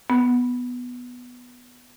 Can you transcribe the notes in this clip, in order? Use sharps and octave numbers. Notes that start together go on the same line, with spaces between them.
B3